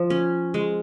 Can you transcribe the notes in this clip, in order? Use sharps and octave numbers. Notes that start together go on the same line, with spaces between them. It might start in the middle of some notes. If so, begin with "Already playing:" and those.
Already playing: F3
C#4
G#3